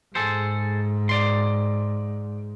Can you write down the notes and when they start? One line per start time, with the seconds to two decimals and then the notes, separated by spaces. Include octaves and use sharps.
0.15 G#2 G#4 A4 C5
1.09 D5 C6